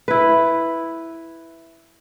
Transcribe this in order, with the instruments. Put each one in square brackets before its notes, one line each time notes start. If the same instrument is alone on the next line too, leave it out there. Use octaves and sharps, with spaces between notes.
[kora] E4 B4